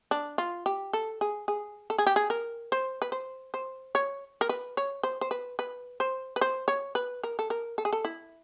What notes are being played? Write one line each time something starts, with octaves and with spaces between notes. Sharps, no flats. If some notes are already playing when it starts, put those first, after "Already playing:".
D4
F4
G4
A4
G#4
G#4
A4
G#4
G4
G#4
A#4
C5
B4
C5
C5
C#5
A#4
B4
C#5
C5
C5
B4
B4
C5
B4
C5
C#5
B4
A#4
A4
A#4
A4
G#4
A4
E4